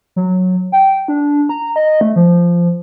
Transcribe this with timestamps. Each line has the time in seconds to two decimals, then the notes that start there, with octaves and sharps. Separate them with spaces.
0.16 F#3
0.72 G5
1.08 D4
1.49 A#5
1.76 D#5
2.01 A3
2.16 F3